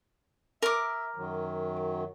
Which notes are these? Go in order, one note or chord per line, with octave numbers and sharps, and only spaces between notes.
A#4 E5 D6
F#2 D#3 F#3